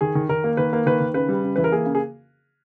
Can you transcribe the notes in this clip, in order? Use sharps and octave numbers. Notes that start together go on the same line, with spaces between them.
D#3 G#4
D#3
D#3 A#4
A#3
D#3 B4
A#3
D#3 B4
D#3
C#3 B4
G3
C#3
E3 B4
A#4
A#3 G#4
C#3
G#4